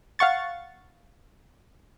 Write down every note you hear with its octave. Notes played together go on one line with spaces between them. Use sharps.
F5 F#5 C#6 A6